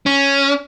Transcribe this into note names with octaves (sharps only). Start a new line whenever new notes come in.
C#4